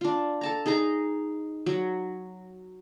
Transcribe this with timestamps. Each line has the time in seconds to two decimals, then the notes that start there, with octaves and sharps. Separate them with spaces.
0.01 D4 F4
0.41 A4 A5 A#5
0.66 D#4 G#4 D#5 A#5
1.66 F#3